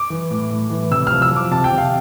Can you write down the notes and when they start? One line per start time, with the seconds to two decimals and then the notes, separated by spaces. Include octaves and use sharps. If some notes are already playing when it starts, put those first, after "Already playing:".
Already playing: D6
0.10 E3
0.31 A2
0.51 A2
0.70 E3
0.91 C3 E6
1.07 F3 F6
1.22 E6
1.32 F3 D6
1.51 C3 A5
1.64 G5
1.72 C3
1.78 F5